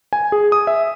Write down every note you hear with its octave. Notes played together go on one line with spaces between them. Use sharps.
G#5
G#4
D#6
E5